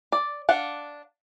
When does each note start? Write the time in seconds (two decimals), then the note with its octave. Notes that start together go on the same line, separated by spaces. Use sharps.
0.12 D5
0.49 D4 F5 F#5